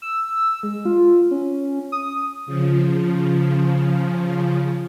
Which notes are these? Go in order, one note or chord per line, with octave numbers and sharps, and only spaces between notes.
E6
G#3
F4
C#4
D#6
C#3 F3